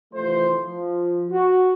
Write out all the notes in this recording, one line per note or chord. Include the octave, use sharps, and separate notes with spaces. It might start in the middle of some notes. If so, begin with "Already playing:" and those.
C3 E3 F3 A3 C5
F3
F#4